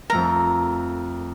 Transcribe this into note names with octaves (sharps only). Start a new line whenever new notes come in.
F2 A3 A#4 A#5